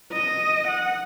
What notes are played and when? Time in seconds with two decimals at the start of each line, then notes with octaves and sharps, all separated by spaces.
0.13 D#5
0.68 F#5